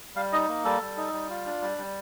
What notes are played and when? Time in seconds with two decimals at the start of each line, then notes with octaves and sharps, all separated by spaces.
0.16 G3 F5
0.32 D#4 D#5
0.48 A#3
0.65 G3 A4
0.81 G3
0.97 D#4
1.13 G3
1.30 F4
1.46 D4
1.62 G3
1.78 G3